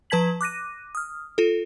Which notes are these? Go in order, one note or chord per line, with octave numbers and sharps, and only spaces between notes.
F3 B4 A5 G#6 B6 F#7
D6 F#6 A#6 D#7
D#6 F6
F4 A4